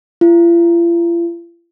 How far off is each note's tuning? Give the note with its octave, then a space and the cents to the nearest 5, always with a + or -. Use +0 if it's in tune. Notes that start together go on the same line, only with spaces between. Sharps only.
F4 -45